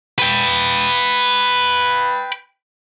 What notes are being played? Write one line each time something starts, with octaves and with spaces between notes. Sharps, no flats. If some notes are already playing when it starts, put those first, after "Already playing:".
B4 G5